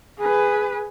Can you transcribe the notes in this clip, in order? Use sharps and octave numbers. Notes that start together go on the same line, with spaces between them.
G#4 B4